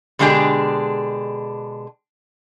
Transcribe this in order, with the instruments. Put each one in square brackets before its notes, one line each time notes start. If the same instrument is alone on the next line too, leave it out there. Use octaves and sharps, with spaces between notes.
[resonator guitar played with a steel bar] B2 D3 G#3 D4 G4 G#4